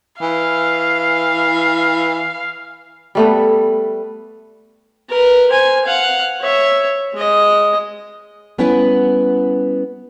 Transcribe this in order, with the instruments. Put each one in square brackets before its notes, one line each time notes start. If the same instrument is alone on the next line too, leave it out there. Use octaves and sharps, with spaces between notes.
[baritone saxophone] E3 [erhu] F5
[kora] G3 A3 B3
[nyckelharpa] A#4 B4
C5 G#5
F5 F#5
C#5 E5
G#3 D#5
[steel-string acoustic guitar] G3 B3 C#4 E4 B4 F#5